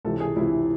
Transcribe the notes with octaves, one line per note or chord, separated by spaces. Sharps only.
C#2 C3 E3 A4
G#4
C#2 C3 E3 E4